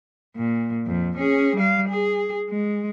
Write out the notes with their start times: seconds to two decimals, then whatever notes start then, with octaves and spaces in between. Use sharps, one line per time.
0.36 A#2
0.86 F2
1.18 C#4 G#4
1.56 G3 F5
1.88 G#4
2.50 G#3